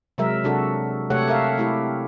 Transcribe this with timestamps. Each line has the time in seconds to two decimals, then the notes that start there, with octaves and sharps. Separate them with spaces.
0.18 C3 F#3 G#3 A#4 E5
0.44 C3 D4 F#4 A4
1.10 C3 A3 G4 A4 C#5 F#5
1.28 A4 A#4 E5 F5
1.58 A3 E4 G4